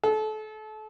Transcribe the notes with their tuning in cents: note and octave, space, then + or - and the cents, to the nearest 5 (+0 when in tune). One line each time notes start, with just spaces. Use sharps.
A4 -30